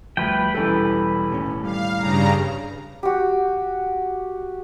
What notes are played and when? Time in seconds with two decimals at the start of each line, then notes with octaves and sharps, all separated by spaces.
0.17 D2 F3 G3 B4 G5
0.55 E1 E3 G3 C#4 A4
1.30 D#2 A2 C#4
1.63 G3 F5
1.97 G2 C#3 A#5
3.03 F#4 G4